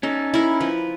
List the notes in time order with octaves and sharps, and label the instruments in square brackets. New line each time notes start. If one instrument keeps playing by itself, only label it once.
[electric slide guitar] C#4 D#4 [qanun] A4
[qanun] E4 A#4
F3 B4